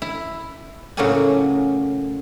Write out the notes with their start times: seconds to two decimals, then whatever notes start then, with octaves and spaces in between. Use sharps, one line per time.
0.02 E4
0.97 A2 C#3 F#3 A#3 G#4 G#5